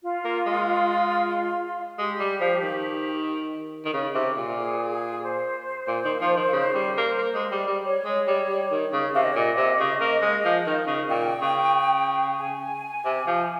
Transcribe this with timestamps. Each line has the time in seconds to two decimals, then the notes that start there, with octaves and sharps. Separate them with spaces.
0.03 F4
0.25 A#3
0.46 G#3
1.98 G#3 G4
2.19 G3
2.41 F3
2.62 D#3
3.85 D#3
3.93 C#3
4.15 C3
4.37 A#2
4.58 G#4
4.91 G#4
5.23 C5
5.88 A#2
6.05 D#3
6.21 F3
6.37 D#3
6.53 C#3
6.75 G3
6.97 A#3
7.18 A#3
7.35 G#3
7.52 G3
7.67 G3
7.84 C#5
8.05 G#3
8.27 G3
8.49 G3
8.71 D#3
8.93 C#3
9.14 C3 F5
9.22 D#5
9.30 C#5
9.35 A#2 D#5
9.57 C3
9.80 C#3
10.01 A#3
10.22 G#3
10.45 F3
10.67 D#3
10.87 C#3
11.09 A#2 G5
11.42 C#3
12.40 G#5
13.05 C3
13.27 F3